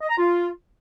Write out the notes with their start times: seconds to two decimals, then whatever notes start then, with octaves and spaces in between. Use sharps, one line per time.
0.01 D#5
0.09 A#5
0.18 F4